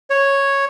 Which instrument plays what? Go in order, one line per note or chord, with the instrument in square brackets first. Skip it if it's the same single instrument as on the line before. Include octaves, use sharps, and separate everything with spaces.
[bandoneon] C#5